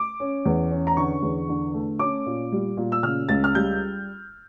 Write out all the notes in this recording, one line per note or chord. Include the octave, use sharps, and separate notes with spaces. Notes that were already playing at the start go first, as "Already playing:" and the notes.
Already playing: D6
C#4
E2
C#4
A#5
D3 C#6
E2
D3
A3
C#4 D6
A#2
G3
A#2
E6
C#3 F6
C#2 A6
F6
G3 G6